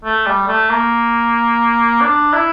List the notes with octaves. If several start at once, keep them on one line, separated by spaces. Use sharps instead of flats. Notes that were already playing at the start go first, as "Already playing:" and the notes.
A3
G3
A3
A#3
D4
E4